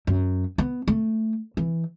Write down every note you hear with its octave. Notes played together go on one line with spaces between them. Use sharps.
F#2
B3
A3
E3